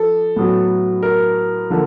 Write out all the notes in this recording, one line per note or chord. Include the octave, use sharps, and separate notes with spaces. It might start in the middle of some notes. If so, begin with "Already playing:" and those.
Already playing: F3 A4
A2 F#3 B3
A#4
D3 F3 A#3 D4